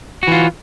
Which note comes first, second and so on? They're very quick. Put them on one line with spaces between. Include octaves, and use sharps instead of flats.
F#4 E3 F4